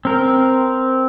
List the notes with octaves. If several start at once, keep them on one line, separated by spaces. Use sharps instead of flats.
C4 A#4